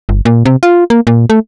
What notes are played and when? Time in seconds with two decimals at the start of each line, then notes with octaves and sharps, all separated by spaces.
0.09 G1
0.25 A#2
0.45 C3
0.63 F4
0.90 A#3
1.07 A#2
1.30 A3